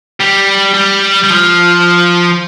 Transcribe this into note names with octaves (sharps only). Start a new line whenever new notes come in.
G3
G3
G3
F3